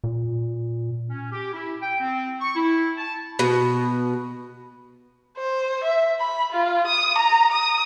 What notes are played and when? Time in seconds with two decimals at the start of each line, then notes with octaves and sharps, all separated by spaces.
0.04 A#2
1.10 C#4
1.32 G4
1.54 E4
1.81 G5
2.00 C4
2.40 C#6
2.55 E4
2.97 A5
3.39 B2
5.37 C5
5.84 E5
6.20 B5
6.53 F4
6.87 D#6
7.18 A#5
7.52 D#6